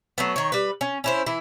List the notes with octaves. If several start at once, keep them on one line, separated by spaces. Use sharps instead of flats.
F#3 A3 B3
D#3 C#5
G3 B4
C#4
C#4 E4 C5
E3 E4